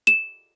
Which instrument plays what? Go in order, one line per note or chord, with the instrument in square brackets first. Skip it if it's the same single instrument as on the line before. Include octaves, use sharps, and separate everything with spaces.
[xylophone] E7